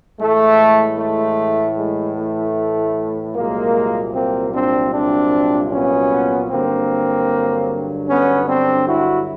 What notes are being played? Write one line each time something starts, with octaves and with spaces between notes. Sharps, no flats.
A2 E3 G#3 A3
A3
G#3
A3
C2 A#2 F#3 G#3 A#3
A#3 C4
C4 D4
C4 D4
B3 C#4
G2 D3 F#3 A#3 C4
B3 C#4
C4 D4
E4 F#4